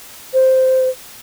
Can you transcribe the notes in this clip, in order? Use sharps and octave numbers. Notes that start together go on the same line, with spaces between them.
C5